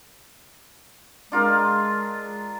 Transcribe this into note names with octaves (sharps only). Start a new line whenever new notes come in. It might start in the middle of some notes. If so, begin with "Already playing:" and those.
G#3 D4 F4 A#4